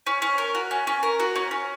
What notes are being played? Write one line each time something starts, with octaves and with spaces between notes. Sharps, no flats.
C#4
C#4
A#4
F#4
C#4
C#4
A#4
F#4
C#4
C#4